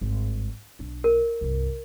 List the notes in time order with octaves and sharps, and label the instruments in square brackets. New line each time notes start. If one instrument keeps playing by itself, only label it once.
[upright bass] G#1 G2
B1 D4
[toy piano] A#4
[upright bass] C2 G2